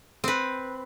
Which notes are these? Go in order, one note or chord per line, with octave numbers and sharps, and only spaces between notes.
C4 B4